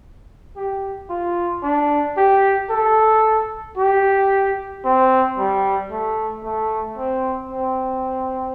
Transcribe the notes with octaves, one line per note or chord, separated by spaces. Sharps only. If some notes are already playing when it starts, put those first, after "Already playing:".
G4
F4
D4
G4
A4
G4
C4
G3
A3
A3
C4
C4